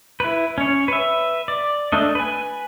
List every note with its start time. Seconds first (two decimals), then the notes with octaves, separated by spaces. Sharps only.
0.20 E4 B4
0.58 C#4 C#5
0.88 B4 E5
1.48 D5
1.92 A3 D4 D#5
2.15 B4 G#5